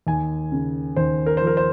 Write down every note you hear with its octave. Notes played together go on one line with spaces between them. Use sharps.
D#2 G#5
C#3
D#2 C5
A#4
F3 C5
A#4
C5